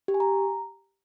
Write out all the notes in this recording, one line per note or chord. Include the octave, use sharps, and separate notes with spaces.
G4
G#5
A#5